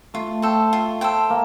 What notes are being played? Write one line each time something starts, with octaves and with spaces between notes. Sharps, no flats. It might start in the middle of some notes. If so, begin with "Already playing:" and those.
A3 F4
A4 C5 G5
F4
A4 C5 G5
A#3